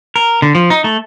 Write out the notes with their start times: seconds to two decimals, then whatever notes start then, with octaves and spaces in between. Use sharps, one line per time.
0.16 A#4
0.42 D3
0.55 F3
0.70 D#4
0.84 A3